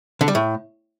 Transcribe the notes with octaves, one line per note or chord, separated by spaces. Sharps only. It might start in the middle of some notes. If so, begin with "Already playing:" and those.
D3
G3
A2